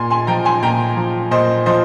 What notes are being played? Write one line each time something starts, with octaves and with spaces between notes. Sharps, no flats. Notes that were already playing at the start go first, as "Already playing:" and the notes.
Already playing: A#2 G#5 C6
G#5 C6
F3 G5 A#5
G#5 C6
A#2 G5 A#5
F3
A#2 C5 D#5
F3 C5 D#5